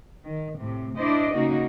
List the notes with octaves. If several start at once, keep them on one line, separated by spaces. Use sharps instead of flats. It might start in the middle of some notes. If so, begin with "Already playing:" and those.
D#3
A2 C3
D4 E4 C5 D5 D#5
C#3 A#3 D#4 F#4